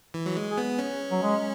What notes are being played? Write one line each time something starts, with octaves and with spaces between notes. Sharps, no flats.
E3
F#3
G#3
G#4
B3
C#4
F#3
G#3